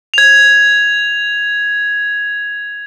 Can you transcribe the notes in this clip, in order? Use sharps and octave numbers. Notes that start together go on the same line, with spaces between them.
G#6 F7